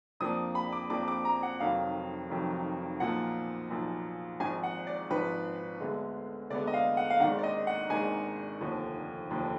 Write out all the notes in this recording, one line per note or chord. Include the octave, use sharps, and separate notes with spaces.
F2 F3 A#3 D4 D#6
B5
D6
F2 F3 A#3 D4 D6
D6
A#5
F#5
F1 F2 D#3 F#3 F5
F1 F2 D#3 F#3
B1 A#2 F3 A#3 F#5
B1 A#2 F3 A#3
G#1 G#2 F3 G#5
F#5
D5
G#1 G#2 F3 B4
D2 D3 G#3 B3
D2 D3 G#3 B3 D5
D#5
F5
F#5
F5
G#1 G#2 D#3 G#3 D4 F#5
D5
D#5
F#5
G#1 G#2 D#3 G#3 D4 G#5
F1 D#2 D3 F3
F1 D#2 D3 F3